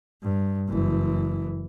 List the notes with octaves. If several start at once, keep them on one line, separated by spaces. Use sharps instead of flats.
G2
F#1 E3